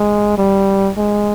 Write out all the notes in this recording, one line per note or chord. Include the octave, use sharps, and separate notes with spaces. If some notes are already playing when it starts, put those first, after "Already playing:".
Already playing: G#3
G3
G#3